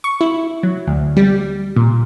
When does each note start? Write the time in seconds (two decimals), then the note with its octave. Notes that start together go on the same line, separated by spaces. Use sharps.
0.04 C#6
0.21 E4
0.63 F#3
0.87 D2
1.17 G3
1.76 A#2